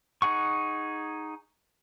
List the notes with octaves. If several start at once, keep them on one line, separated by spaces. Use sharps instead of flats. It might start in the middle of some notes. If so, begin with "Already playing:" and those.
D#4 G#4 F#5 C#6